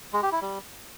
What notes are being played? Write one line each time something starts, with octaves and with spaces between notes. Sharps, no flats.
G#3
G4
E4
G3